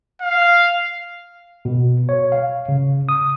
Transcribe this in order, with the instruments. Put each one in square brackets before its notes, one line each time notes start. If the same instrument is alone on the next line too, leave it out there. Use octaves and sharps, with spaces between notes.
[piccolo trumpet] F5
[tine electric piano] B2
C#5
F5
C#3
D#6